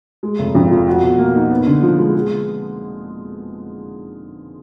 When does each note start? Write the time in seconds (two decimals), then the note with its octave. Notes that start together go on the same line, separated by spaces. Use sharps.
0.23 G#3
0.39 F1
0.55 F2
0.71 F3
0.87 F#4
1.03 B2
1.18 A#3
1.35 D#4
1.51 B3
1.66 D3
1.83 F3
1.98 G#3
2.14 G#4